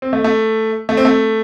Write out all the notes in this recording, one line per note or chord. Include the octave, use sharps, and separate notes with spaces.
C4
A3
A3
A3
C4
A3